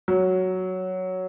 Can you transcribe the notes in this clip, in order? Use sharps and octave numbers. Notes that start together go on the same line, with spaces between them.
F#3